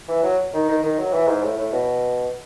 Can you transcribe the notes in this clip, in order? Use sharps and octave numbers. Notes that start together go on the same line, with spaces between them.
E3
F#3
D#3
D#3
D#3
F#3
E3
G#2
A2
A2
B2